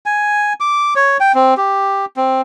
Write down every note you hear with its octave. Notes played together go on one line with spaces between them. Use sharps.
G#5
D6
C#5
G5
C4
G4
C4